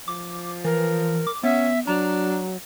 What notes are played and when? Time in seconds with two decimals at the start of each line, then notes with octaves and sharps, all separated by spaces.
0.08 F3 D6
0.64 E3 A#4
1.27 D6
1.43 B3 C#4 E5
1.87 F#3 D4 A#5